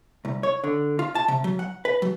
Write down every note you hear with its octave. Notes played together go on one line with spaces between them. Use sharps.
C2
C#5
D3
F4
A5
C3
F#3
F#5
B4
F#3